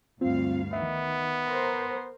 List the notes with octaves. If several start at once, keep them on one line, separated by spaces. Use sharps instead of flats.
D2 G2 C4 F4 F5
D#3 B3 E5
A#4 C5